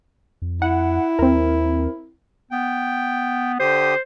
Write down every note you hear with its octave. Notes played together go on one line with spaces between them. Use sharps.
F2
E4 F#5
D#2 C4 A#4
B3 G5
D3 G4 C5 D#6